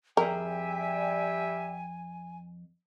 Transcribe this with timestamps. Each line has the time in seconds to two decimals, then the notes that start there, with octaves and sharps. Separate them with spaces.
0.17 F2 G3 G#4 A#4 E5 G5 G#5